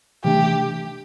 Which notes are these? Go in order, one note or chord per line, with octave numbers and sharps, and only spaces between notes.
C3 E3 A3 D4 G4